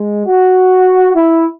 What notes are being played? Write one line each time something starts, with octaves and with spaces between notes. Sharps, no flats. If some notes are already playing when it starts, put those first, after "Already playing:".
Already playing: G#3
F#4
E4